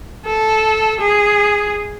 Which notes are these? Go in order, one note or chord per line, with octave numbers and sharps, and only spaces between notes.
A4
G#4